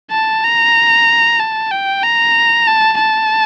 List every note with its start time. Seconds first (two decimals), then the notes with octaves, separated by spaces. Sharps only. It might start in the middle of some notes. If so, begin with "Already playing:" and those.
0.11 A5
0.44 A#5
1.40 A5
1.71 G5
2.03 A#5
2.67 A5
2.99 A5